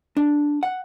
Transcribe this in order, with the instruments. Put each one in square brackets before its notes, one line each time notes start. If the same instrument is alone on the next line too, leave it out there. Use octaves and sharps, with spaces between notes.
[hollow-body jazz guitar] D4
F#5